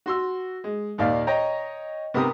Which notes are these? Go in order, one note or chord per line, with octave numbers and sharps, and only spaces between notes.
F#4 C6 E6
G#3
D#2 A#2 D5 F5
C#5 D#5 G5 A#5
C3 B3 G4 A#4 D#6